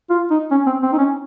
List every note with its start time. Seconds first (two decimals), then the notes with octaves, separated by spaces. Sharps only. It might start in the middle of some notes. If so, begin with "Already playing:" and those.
0.10 F4
0.31 D#4
0.51 C#4
0.66 C4
0.83 C4
0.93 D#4
0.98 C#4